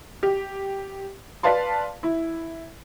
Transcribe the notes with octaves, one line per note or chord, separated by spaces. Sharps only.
G4
B4 D5 F5 A5 C6
E4